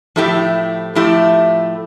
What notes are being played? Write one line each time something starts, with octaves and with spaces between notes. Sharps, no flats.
A2 F3 A3 E4 G4
A2 F3 A3 E4 G4